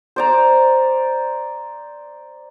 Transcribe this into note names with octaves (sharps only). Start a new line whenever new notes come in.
C5 D5 A#5